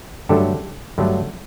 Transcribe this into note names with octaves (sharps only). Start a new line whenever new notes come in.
G2 D3 F#3 A3 G4 A4
G2 D3 F#3 A3